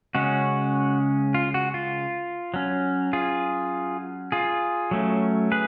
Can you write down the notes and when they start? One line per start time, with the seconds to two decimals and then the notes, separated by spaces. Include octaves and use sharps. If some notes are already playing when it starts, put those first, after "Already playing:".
0.15 C#3 G#3 C#4 F#4
1.34 F4
1.54 F#4
1.74 F4
2.54 F#3 C#4
3.13 F4 G#4
4.32 F4 G#4
4.91 F#3 A3 C#4
5.52 G#4 B4